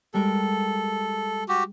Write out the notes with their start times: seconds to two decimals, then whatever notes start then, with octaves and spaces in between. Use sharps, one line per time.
0.14 G3 G#3 A4 A#4
1.49 F#4 G4